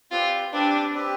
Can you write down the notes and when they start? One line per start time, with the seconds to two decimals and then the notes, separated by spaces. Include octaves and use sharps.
0.11 C4 F4 G4 B4 D5
0.52 C4 D4 G4 B4 D5
0.94 C4 G4 B4 D5